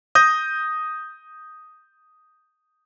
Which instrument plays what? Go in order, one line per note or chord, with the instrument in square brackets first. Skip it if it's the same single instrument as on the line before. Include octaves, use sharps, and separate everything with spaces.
[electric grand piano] D#6 G6 A#6